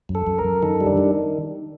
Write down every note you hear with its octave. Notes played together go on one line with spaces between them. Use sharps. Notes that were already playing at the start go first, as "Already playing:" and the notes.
F#2
A4
F#2
A#4
F#2
D#3 A4
G3
D4
D#3